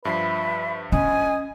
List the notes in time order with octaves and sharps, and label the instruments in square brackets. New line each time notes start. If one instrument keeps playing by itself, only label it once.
[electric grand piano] G2 F3 C7 [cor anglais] B4 [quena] E5
[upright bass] C#4 [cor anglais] D#5 [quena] G#5